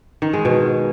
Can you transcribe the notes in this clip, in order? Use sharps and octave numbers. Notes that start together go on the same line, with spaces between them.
D#3
G#3
B2